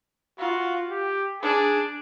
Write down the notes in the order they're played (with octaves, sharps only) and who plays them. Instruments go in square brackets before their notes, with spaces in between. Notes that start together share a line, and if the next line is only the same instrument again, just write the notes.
[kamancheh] F4 [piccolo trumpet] F#4
[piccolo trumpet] G4
[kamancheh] D4 [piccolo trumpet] G#4